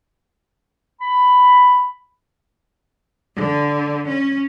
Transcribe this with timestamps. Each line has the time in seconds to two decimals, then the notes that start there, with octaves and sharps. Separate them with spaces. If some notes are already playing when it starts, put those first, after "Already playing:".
1.01 B5
3.36 D3
4.08 C#4